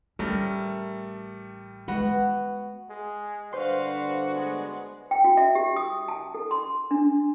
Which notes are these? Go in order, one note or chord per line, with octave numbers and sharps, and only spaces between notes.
A1 G3 A3 C#4 A#4
G#3 B3 F#4
G#3
G2 D3 F#4 B4 C5 D5 F5 C6
G#3 B3
G5
F#4
E5
G4
D#6
A5
A4
C6
D4